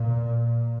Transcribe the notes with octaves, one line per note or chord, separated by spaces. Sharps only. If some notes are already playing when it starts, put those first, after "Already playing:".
Already playing: A#2